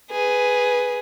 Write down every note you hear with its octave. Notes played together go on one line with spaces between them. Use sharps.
G#4 B4